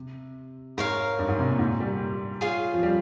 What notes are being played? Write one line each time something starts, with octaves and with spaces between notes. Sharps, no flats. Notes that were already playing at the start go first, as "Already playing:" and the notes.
Already playing: C3
G#2 A#4 C#5 F5
G2
G#2
C3
A#2
G#2
G3
F4 G#4 C#5 F5
F3
G3